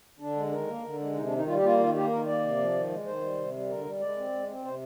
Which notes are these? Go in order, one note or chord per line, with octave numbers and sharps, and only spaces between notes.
D3 D4
G#3
D#3 A#4
A#3
D3
G#3
C3 D#4
D4
D#3
D#4
G3 F4
G4
A#3 F4
D#3 F4
A#3 G4
D#3 A#4
A#3 D5
C3
F3
D#3
G#3
D#3 C5
G3
C3
G3
D3 A#4
G3
G#3 D5
C4
G#3
C4
C3 C5